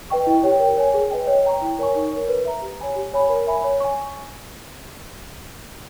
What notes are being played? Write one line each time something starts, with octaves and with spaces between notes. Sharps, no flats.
B4 D#5 G5 C#6
E4
G4 C#5 G5
A#4
C#5 G#5
G#4
B4 D#5 G5
C#5
G5 A#5 C#6
E4
A#4 C#5 G#5 C#6
D#4
C#5
A#4
B4
E5 A#5
G4
C#5 G#5 B5
G4
C#5 G#5 B5
A#4
E5 G#5 B5
C#5
G#5 C#6